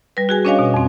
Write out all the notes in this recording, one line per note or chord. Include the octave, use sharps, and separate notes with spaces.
G3 B4
F#4 G#4 G#5
C#4 D4 C#5 D#5 F5 G#5
B2
F2 C4